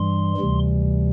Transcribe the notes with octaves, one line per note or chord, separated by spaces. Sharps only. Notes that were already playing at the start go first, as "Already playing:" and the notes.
Already playing: G2 E3 G3 C6
D2 C3 E3 G3